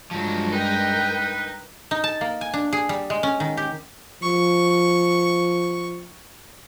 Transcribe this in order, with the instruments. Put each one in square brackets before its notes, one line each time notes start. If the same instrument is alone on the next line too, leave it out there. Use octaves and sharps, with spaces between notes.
[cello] G2 G#3 [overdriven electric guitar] F3 F#3
[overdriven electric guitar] D#4 [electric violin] A#4 G5 [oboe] B4
[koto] D#4
A5
A#3
G#5
D4
G#4
G3
G#3
C#4
D#3
G4
[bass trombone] F3 [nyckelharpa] C#6